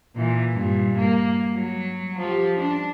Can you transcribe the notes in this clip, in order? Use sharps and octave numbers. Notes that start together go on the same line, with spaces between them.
A#2 E3
G2 A#2
A#3
F#3
F3 G4
D4